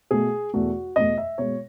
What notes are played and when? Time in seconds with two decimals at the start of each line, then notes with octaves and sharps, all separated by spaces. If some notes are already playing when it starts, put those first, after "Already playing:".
0.11 B2 A3 G#4
0.53 E2 B2 A3 F#4
0.96 E2 B2 A3 D#5
1.17 E5
1.38 B2 G#3 C#5